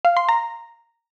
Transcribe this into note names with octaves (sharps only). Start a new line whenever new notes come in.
F5
C6
A#5